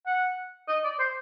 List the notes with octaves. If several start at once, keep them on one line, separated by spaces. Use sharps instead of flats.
F#5
D#5
D5
C5